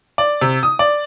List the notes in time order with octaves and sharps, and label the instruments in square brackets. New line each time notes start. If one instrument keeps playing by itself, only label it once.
[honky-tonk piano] D5
C3
D#6
D5